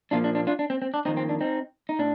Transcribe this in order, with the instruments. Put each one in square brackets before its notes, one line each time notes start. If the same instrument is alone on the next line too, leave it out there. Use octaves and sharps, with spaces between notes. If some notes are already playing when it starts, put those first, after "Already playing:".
[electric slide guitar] A#2 F3 A#3 D4 F4
D4
D4
D4 F4
D4
C4
C4
D4
F2 D#3 A#3 C4 D#4
C4
D4
C4 D#4
D#4
A2 D4